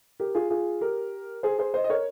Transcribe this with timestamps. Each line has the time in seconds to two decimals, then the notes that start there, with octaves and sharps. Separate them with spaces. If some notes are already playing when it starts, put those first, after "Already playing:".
0.20 G4 A#4
0.35 F4 G#4
0.50 F4 G#4
0.81 G4 A#4
1.43 G#4 C5
1.59 G#4 C5
1.74 C5 D#5
1.84 D#5
1.89 A#4 C#5